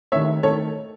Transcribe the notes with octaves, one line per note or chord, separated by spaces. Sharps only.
D#2 D#3 A3 C#5 E5
D#3 A3 A4 C#5